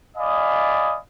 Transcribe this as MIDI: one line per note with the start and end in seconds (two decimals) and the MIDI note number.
0.17 0.98 74
0.17 0.98 75
0.17 0.98 77
0.17 0.98 80
0.17 0.98 83
0.17 0.98 87